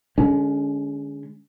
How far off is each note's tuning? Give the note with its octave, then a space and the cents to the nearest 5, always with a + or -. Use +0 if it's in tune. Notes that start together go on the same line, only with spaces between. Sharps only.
D3 +20 G#3 +0 C#4 +30